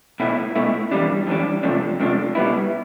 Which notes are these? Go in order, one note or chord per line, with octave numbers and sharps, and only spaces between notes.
B2 A3 E4
B2 A3 E4
F2 E3 G3 D4
F2 E3 G3 D4
F2 C3 F3 A3 D4
F2 C3 F3 A3 D4
B2 G3 B3 E4